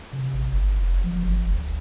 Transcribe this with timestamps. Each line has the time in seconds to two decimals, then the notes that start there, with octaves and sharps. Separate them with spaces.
0.13 C3
0.33 A1
0.49 G1
0.76 F1
1.04 F3
1.23 G1
1.41 F#1
1.53 D2